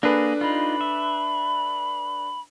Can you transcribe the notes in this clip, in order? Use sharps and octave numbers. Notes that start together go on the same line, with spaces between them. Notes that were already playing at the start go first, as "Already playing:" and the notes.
A#3 D4 G#4 A4 B4
D#4 F4 B5
E5